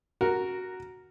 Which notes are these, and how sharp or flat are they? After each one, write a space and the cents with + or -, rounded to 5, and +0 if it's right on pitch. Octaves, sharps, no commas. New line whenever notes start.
F#4 +0 A#4 +0